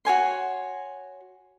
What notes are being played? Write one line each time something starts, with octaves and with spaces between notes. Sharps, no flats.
F#4 C#5 G#5 C6